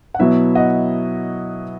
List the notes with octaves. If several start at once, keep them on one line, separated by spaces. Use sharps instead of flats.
F#5
B2 F#3 B3 E4 E5
D#5 F#5